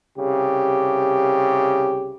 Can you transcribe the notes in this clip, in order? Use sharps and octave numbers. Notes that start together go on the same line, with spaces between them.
C2 C#3 G4